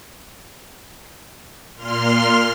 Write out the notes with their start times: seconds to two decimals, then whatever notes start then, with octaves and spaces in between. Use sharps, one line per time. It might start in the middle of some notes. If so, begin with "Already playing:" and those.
1.76 A#2 C6 F6